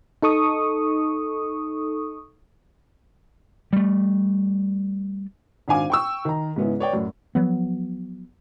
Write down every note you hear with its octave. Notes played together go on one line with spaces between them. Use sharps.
D#4 A4 C#6 D#6
G3 A3
G#1 D4 F5 G#5 D6
G5 C#6 E6
D#3 A#5
G#2 C#3 B3 C#4 E4
B4 C#5 D5 G5
F#2 A2
F3 F#3 B3